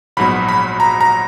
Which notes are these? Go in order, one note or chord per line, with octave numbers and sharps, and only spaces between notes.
A#1 G#2 F#3 B3 B5
B5
A#5
A#5